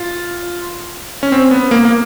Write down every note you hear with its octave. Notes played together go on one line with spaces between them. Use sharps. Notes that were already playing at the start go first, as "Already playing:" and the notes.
Already playing: F4
C#4
C4
B3
A#3
A#3